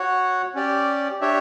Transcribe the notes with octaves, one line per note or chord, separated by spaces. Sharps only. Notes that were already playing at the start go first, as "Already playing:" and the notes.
Already playing: F#4 C#5 F#5
C#4 G4 D5
D4 G4 C#5 E5